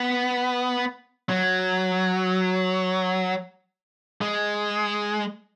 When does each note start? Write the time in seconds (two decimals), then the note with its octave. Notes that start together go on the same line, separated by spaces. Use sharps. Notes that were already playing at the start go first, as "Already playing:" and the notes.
Already playing: B3
1.29 F#3
4.21 G#3